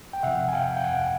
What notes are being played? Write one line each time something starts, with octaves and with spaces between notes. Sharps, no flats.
G5
C3 F3 E5 F#5
G#5
F5 G5
G5
F#5 G#5